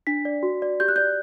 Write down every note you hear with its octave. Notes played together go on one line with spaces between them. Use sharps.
D4 B6
D5
F#4
D5
G4 G6
F#6
D5 G6